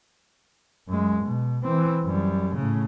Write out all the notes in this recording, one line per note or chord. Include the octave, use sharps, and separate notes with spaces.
F#2 G#3
B2
E3 C4
F#2 G3
A2 C#3